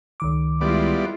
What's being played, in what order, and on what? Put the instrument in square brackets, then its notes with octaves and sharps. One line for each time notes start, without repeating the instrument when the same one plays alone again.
[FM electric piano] C#2 D#3 D6
[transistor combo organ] G3 B3 D5 [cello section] G#3 E4 F4